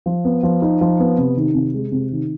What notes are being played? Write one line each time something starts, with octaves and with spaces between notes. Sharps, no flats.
F3
B3
F3
D#4
F3
B3
C3
D#3
C3
G#3
C3
D#3